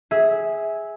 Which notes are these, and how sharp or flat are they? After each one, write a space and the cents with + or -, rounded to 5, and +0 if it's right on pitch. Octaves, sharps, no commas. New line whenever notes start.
G#4 +0 E5 -15